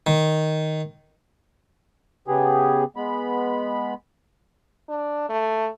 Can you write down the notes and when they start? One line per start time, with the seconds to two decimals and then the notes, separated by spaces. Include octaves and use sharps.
0.07 D#3
2.28 C#3 B3 G4 G#4
2.96 G#3 B3 B5
4.89 D4
5.29 A3